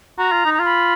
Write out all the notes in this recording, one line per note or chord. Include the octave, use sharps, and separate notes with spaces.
F#4 A#5
F4
D#4
A#5
F4
B5